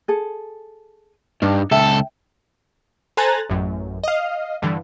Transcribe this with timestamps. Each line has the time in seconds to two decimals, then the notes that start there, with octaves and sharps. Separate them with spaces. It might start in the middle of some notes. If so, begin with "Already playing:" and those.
0.08 G#4 A4
1.42 G2 D4 D#4
1.71 C#2 A4 E5 G5
3.17 A4 C5 G#5 A#5 F#6 A6
3.50 A1 F#2
4.03 D#5 F5
4.62 G2 D3 E3